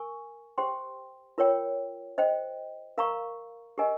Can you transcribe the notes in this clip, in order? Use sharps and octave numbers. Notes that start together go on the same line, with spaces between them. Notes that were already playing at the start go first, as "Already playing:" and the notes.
Already playing: A#4 G#5 C#6
G4 C5 G5 C6
F4 A#4 C#5 G5
C5 D#5 G5
A#4 F5 A#5 C#6
G4 A#4 D#5 G#5